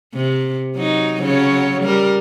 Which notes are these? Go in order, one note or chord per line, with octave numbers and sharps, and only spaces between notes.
C3
F#3 D#4
C#3 F#3 C#5
G3 A#4